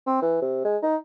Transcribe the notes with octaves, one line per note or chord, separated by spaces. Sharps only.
C4
E3
C3
G#3
D#4